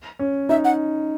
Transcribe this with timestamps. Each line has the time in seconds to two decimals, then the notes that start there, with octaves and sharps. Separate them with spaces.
0.19 C#4
0.49 D#4 E5
0.65 F#5